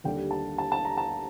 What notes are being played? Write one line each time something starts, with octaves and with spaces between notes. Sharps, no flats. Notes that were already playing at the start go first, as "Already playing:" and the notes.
D#2 D3 G3 G5
A5
A5
A5
A#5
A5